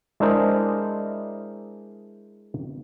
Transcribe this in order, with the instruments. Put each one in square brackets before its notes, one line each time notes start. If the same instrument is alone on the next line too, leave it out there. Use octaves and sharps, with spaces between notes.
[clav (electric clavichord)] G#3 D4 E4 A#4 C5 D#5